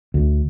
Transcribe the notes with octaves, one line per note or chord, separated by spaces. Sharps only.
D2